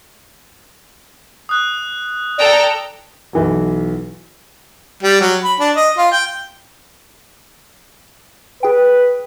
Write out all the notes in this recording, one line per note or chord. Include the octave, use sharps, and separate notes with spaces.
D#6 F#6
A4 D5 G5 A#5
B1 E3 F#3
G3
F#3
B5
D4
D#5
F4
G5
G#4 B4 G5